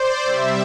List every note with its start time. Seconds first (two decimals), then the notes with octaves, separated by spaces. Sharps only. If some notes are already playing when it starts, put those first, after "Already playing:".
Already playing: C5 D5
0.23 C3 G3 E5